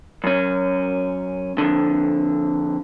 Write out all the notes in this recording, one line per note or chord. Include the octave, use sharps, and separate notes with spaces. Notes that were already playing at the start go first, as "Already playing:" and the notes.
F#2 C#4
F2 D3